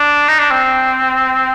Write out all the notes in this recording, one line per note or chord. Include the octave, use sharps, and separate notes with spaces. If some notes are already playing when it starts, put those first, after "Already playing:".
Already playing: D4
D#4
D4
C4